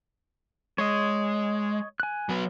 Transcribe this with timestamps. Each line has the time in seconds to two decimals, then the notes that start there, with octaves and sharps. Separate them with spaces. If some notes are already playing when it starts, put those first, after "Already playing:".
0.78 G#3 C#5 D#5
2.00 G#5 F#6
2.29 F#3 B3